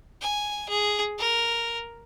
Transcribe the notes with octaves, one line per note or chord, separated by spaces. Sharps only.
G#5
G#4
A#4